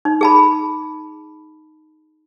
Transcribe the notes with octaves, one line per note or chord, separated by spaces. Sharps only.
D#4
G#4 A5 B5